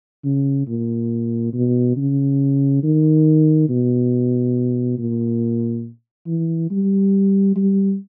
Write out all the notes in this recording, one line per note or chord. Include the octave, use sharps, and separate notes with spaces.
C#3
A#2
B2
C#3
D#3
B2
A#2
E3
G3
G3